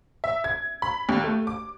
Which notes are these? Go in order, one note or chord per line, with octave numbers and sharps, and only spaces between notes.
E5
G#6
B5
D#2
A3
D6